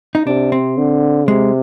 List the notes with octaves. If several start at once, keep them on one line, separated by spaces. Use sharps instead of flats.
D#4
C3 D4
C4
D3
C3 G#3